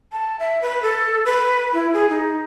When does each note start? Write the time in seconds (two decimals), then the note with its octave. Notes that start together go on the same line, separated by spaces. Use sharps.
0.12 A5
0.40 E5
0.62 B4
0.83 A4
1.26 B4
1.73 E4
1.93 G#4
2.10 D#4